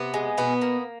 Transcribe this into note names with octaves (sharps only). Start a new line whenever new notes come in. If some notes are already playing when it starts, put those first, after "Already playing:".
Already playing: C3 B3
G#3
B2 B3
A#3